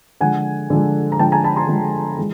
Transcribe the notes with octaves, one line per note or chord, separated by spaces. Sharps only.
D3 F3 G#3 F#5 G#5
D3 F3 G#3
A#5
D3 F3 G#3 G5 A5
G#5 A#5
A5 B5
A#5 C6
D3 F3 G#3
E3 G#3